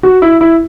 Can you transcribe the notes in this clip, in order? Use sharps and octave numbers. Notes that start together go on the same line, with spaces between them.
F#4
E4
E4